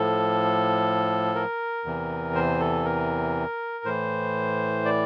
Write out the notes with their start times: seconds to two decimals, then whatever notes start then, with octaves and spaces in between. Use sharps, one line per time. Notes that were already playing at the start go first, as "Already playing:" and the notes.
Already playing: A2 F3 A4
1.35 A#4
1.85 E2 C3 E3
2.35 C5
2.60 A4
2.85 A#4
3.85 A2 E3 C5
4.85 D5